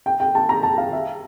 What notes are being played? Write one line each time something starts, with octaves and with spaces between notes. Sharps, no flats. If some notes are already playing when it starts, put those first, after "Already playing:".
G5
G5
A5
A#5
A5
F5
E5